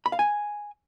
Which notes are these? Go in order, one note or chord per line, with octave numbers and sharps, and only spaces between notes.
B5
F5
G#5